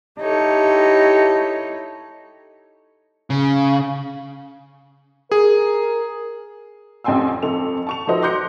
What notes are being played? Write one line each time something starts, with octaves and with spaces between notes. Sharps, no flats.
D#4 E4 G4 A4 C#5
C#3
G#4 A#4
A1 F2 G5 G#5 C6 E6
F2 A4 F7
A5 C#6 F7
F3 F#4 A4 B4 C5 D#5
C6 D6 F#6 G6 A#6 C#7